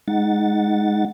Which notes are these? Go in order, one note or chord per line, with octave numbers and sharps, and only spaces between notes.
G#3 D#4 F#5 A6